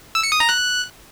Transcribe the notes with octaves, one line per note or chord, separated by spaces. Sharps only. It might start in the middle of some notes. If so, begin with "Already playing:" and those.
E6
C#7
D#6
A#5
F#6